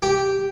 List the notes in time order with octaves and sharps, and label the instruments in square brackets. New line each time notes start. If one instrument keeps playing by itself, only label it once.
[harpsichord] G4